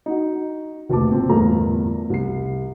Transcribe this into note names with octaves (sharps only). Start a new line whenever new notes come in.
D#4 F#4
F1 D2 A#2 A5 D6
A#2 C4
G1 E2 A2 A4 A#4 A#5
C2 C7